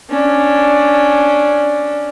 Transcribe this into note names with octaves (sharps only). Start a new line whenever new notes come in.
C#4 D4